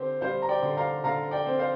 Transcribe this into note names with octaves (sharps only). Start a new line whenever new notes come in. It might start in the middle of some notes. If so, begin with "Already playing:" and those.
Already playing: D3 C4 G4 C5
G3 C5 F5
A#5
D5 G5
D3
F5 A#5
D3 F5 A#5
D5 G5
C4
C5 F5